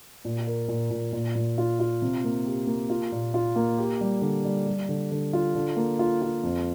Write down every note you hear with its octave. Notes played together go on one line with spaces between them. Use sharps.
A#2
A#4
A#2
A#2
A#2
A#2
F4
F4
C3
A#3
G4
A#3
F4
A#2
F4
A#3
G4
G3
D3
G3
G3
D3
D3
F4
D3
A#3
F4
F4
F2